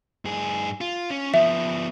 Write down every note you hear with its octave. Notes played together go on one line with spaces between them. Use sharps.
G2 G#4
F4
C#4
F3 B3 E5